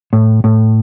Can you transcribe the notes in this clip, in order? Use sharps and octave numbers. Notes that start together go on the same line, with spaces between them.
A2
A2